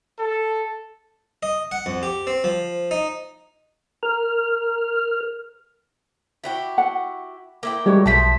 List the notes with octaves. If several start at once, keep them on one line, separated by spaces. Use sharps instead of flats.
A4
D#5
F#5
F2
G4
C4
F3
D#4
A#4 F6
E4 F#4 G4
F#5
A#3 E4 G5
G3 G#3 F#4 C#5
B1 F3 C5 E5 A5 B6